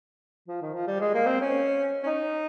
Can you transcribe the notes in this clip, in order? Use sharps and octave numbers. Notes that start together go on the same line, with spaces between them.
F3
D#3
F3
G3
G#3
A#3
C4
C#4
C#4
D#4